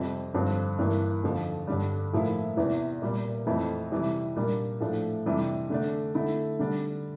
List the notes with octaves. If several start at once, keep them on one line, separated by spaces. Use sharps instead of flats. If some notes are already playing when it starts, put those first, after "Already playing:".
Already playing: F2 C3 G3 C4
G2 D3 F3 C4
G2 E3 A#3
F2 D3 F3
G2 D3 G3
A2 F3 A#3 E4
E2 C3 E3
A#2 G3 A#3
F2 E3 A3 C4 E4
C3 E3 G3
A#2 G3 A#3 D4
A2 F3 A3 D4
F2 C3 E3 G3 D4
D3 A3 D4
D3 A3 E4
D3 G3 D4